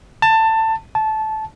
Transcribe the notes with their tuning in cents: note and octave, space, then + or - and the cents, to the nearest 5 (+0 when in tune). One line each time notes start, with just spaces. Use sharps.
A5 +20
A5 -15